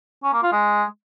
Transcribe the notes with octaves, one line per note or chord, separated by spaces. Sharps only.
C#4
A#3
F4
G#3